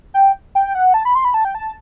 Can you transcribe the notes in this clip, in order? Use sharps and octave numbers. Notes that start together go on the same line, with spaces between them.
G5
G5
F#5
A5
B5
C6
B5
A5
G5
A5